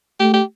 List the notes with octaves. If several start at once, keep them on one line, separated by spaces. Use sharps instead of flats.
A3 G4
G4